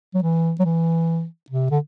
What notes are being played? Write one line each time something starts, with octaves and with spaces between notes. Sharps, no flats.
F#3
E3
F#3
E3
C3
D3